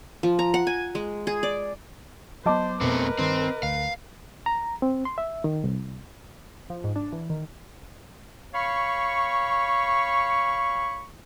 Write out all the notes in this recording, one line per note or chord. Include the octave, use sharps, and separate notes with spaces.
F3
A#5
F#5
G#5
G#3
G#4
D5
F#3 B3 C5 D#5 A5 D6
F2 B2 A3 B3 C4 A#4 B4
G2 D#3 C4
D2 F5
A#5
C4
C6
E5
D#3
C2
F3
G#2
D4
E3
D#3
C#5 F5 B5 C#6